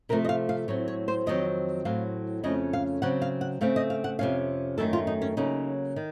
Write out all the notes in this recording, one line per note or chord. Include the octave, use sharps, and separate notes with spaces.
C3 F3 A3 A#4
D#5
F5
F5
A2 F#3 C4 C#5
C#5
C5
F2 D#3 F#3 C4 D#5
A2 F#3 C4 F5
F2 C#3 A3 C#4 D#5
F5
C#3 F#3 C4 F#5
F5
F#5
C#3 A3 C4 F5
D#5
F5
F#5
F2 C3 D#3 A#3 C#4 F5
F#2 D#3 A3 A4
F4
D#4
C#4
C#3 F#3 A#3 C#4 D#4
D#3